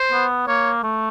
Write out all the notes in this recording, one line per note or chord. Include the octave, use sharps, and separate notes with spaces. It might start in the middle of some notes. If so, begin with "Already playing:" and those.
Already playing: C5
B3
A#3 C#5
A3